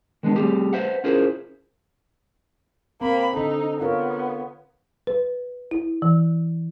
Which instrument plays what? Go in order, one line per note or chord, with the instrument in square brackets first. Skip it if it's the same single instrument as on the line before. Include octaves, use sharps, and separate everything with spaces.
[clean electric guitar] D#3 G#3 B3 D4
G3 A3 B3 C4 G4 G#4
B4 C5 E5 F#5
C#4 E4 F4 G#4 A#4 C5
[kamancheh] A#3 B5 [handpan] C4
[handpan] D3 A4 [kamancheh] D#4
[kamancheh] B3 [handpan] F4 A#4 C#5
[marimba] B4
E4
E3